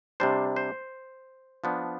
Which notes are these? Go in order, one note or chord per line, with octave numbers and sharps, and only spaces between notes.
C3 G3 D4 C5
C5
F3 B3 D4